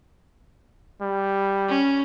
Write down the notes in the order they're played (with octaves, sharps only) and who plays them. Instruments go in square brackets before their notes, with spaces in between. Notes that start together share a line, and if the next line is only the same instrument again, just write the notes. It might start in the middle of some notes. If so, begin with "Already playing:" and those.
[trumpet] G3
[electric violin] C#4